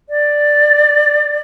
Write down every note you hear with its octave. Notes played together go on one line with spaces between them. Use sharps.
D5